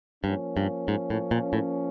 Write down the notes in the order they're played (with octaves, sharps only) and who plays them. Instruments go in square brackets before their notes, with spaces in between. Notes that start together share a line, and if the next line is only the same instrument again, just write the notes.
[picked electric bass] G2 [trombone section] F3 A#3 C#4
[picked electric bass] G2
G#2
A2
A#2
A2